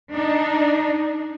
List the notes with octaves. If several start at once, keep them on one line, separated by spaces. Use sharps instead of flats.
D4 D#4